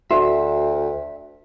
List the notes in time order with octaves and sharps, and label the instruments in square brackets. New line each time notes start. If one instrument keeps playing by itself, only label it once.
[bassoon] D2 [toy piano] F#4 [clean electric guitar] E5